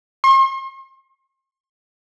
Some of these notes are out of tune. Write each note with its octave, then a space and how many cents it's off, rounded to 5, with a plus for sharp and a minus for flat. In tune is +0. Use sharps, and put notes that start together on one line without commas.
C6 +45